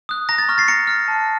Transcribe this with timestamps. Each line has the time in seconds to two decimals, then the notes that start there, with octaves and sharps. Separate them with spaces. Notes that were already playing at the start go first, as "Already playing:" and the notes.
0.09 D#6 F#6
0.29 A#5 A#6
0.38 A6
0.49 C#6 F6
0.58 A6 C7
0.68 A#5 A#6 C#7
0.87 F6
1.08 A5